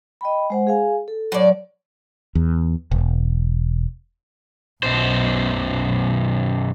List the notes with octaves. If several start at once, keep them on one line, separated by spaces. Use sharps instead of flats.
D#5 G5 B5
G#3 C5 F#5
G#4 F5 G#5
A4
A2 F#3 C#5 D5
E2
E1
B1 F#2 B2 C5